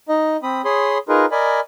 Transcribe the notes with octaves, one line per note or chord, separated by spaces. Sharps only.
D#4 D#5
C4 B5 D#6
G#4 C#5 B5 C6 D#6
D#4 F4 G#4 A#4 B4
A#4 D5 D#5 G#5 B5